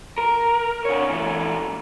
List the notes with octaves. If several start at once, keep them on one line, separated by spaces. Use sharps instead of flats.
A#4
D3 C#5
A#2 E3